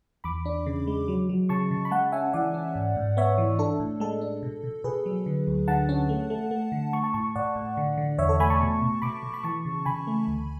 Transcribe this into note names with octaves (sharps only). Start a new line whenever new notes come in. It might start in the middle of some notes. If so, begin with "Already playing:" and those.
E2 B5 D6
D4
C#3
G#3
F#3
F#3
C#3 A5 C#6
C#3
B5
G#3 F#5 A5
C#4 E5 G#5
E3 D5 F#5
C#4
G#2
G#2
B3 C#5 E5
E3
D4 A4
A2
G#3 A4
D4
B2
B2
B2 G#4 B4
F#3
D3
D2
D3 F#5 A5
C#4
A3
A3
A3
D3
A3 A5 C#6
A5 C#6
A2 A5 C#6
A2 D5 F#5
A2
D3
D3
E2 C#5 E5
A4 C#5
A3 G#5 B5
A5 C#6
B2
B2
B2 B5 D6
B2
B5
E3 A5 C#6
C#3
C#3 G#5 B5
A3
D2